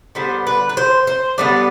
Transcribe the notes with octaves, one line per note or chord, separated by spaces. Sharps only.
D3 G3 B3 C5
B4
B4
C5
C5
D3 G3 B3 D5